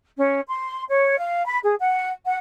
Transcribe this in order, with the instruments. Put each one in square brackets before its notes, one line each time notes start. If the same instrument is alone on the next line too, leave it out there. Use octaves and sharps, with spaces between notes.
[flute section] C#4
C6
C#5
F5
B5
G#4
F#5
F#5